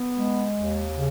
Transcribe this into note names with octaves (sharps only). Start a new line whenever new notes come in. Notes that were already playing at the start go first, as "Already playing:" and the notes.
Already playing: B3
G#3
D#2
C#3